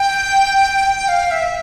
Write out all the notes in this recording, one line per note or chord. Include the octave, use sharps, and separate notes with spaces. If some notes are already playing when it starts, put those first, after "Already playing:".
Already playing: G5
F5
E5